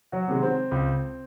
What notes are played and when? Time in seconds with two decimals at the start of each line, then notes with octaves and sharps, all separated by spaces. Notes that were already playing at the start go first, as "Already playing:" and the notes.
0.12 F#3 F#4
0.28 C3 D#3 G#3
0.42 C4
0.71 C#2